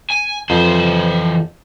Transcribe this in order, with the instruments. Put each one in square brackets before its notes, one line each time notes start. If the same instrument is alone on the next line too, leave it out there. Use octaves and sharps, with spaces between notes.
[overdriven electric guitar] G#5
[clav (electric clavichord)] F2 [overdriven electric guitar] E3 C5